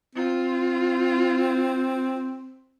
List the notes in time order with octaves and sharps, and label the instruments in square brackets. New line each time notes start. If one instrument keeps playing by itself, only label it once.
[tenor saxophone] C4 [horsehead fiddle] F4